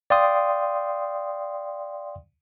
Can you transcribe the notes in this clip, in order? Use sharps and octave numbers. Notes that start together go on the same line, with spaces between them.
D5 F5 G5 C6 D#6